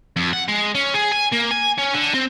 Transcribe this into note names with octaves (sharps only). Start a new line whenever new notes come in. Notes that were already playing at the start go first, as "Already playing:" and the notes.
F2
F#5
G#3
C#4
G#4
G#5
A#3
G#5
C#4
D3
C4